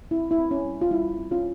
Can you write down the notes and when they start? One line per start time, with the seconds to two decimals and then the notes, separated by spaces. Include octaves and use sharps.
0.11 C4 E4
0.31 E4
0.38 C4
0.51 C#4
0.65 G3
0.82 F4
0.91 G3 E4
1.18 C4
1.31 C#4 F4